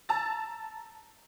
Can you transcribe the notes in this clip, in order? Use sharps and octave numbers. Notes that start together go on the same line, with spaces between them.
A5 A#5 E6 A6